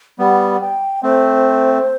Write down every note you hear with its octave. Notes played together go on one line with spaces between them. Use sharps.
G3 B3 F#5
G5
A3 C4 C5